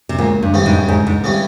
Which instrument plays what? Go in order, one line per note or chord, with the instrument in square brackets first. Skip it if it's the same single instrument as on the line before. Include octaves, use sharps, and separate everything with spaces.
[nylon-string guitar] C3
[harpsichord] C#2 [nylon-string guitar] A#2
[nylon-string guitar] G2
[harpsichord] C#3 E3 G3 C#4
[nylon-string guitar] G#2
[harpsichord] C#2 [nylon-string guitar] G#2
[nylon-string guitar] G#2
[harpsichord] C#3 E3 G3 C#4